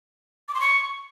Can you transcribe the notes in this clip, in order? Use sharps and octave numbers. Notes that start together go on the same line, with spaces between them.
D6
C6
C#6